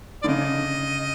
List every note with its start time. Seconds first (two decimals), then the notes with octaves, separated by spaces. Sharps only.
0.22 D3 D5
0.28 C#3 D#5